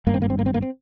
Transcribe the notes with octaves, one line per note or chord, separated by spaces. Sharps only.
G#1 G2 A#3
C4
A#3
C4
A#3
C4
A#3
C4